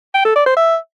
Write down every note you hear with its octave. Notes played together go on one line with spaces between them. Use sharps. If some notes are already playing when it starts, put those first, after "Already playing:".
G5
A4
D5
C5
E5